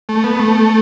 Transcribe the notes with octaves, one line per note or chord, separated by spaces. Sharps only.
A3
B3
A3